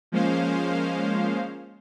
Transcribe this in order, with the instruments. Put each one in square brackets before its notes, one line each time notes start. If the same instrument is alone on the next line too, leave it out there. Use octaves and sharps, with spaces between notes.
[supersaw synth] F3 G#3 A#3 C#4 C5 F5